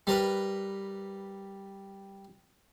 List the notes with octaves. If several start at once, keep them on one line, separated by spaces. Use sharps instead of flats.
G3 A#4 B4